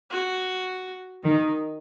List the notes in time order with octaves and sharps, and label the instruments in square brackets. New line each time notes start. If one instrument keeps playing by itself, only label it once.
[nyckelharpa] F#4
[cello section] D#3 [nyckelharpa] D#4